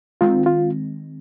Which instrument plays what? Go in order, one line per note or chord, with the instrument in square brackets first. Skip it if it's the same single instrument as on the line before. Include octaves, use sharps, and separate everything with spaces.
[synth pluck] D#3 G#3 C4 [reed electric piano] F4
[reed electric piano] F4